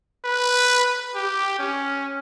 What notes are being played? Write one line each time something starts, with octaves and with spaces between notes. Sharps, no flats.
B4
G4
C#4